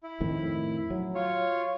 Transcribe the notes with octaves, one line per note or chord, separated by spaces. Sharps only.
E4
F2 A2 D#3
F#3
F4 C#5